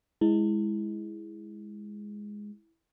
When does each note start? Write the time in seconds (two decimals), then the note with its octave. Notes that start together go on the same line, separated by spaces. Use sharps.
0.21 G#3 E4